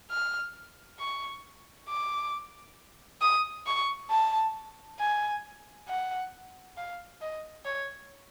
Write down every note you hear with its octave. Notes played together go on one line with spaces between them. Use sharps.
F6
C#6
D6
D#6
C#6
A5
G#5
F#5
F5
D#5
C#5